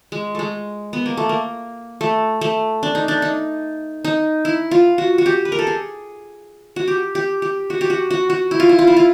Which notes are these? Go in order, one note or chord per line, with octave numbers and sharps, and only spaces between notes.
G#3
G#3 A3
B3
A#3
A3
A#3
A3
A3
D4
D#4
D4
D#4
D#4
E4
F4
F#4
F#4
G4
B4
A#4
A4
G#4
F#4
G4
G4
G4
F#4
G4
F#4
F#4
F#4
E4
F4
E4
F4
E4
F4